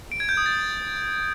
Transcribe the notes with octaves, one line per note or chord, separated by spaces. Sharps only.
D7
G#6
G6
D#6
A6